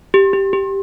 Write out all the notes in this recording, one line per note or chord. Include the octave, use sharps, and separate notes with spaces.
G4
G4
G4